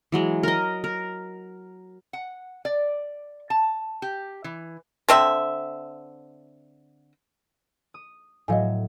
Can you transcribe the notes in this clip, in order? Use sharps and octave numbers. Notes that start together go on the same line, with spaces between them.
E3 F#3 G#3
A#4 D#5
A#4
F#5
D5
A5
G4
E3
D3 C4 E5
D#6
A2 F#3 D#5 F5 G#5